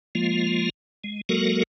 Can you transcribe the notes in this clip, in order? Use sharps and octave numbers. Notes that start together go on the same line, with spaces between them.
F3 G#3 A#3 F4
G#3
F#3 G#3 A#3 F#4 A4 A#4